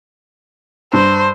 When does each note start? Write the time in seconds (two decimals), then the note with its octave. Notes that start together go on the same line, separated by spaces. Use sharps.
0.93 G2 C5